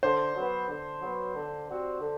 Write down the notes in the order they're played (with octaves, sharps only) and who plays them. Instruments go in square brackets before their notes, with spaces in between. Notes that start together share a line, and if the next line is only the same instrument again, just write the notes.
[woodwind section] D3 [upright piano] C5
[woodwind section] F#3 B3
D3
F#3 B3
D3
G3 C4 F#4
D3